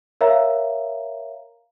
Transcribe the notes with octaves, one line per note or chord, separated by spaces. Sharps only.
A#4 C#5 E5 F5 A#5